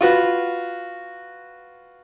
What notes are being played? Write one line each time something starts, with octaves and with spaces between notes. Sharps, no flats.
F4 F#4 B4